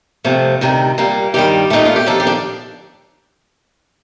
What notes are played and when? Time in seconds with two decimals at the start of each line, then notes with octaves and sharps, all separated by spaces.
0.24 F2 C3 F3 A3
0.61 D2 C3 D#3 G3
0.98 A#2 G3 A#3
1.34 G2 D#3 G3 G4
1.70 A#2 A3 D#4
1.85 F4
1.96 G4
2.06 D#2 D3 F3 A4
2.20 G4
2.27 D4